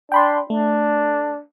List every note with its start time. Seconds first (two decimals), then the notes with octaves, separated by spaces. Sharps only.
0.12 D4 G5 B5 C6
0.50 A3 D4